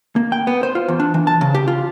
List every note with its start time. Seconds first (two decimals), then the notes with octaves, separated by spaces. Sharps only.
0.16 A#3
0.32 G5
0.47 B3
0.63 C5
0.75 F4
0.88 E2
1.00 D4
1.14 E3
1.27 A5
1.41 C#3
1.54 G4
1.68 F4